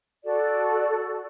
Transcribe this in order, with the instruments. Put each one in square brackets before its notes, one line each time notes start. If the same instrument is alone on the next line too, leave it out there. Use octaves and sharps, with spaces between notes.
[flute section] F#4 A4 D5